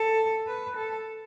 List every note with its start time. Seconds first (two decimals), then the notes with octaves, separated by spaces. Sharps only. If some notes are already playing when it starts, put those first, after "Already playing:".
Already playing: A4
0.47 B4
0.76 A4